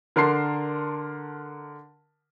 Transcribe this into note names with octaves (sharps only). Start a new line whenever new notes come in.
D3 A#4 A5 C6 C7